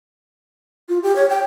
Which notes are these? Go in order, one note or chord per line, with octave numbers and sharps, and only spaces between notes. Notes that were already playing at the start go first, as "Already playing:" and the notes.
F4
G4
C#5
G5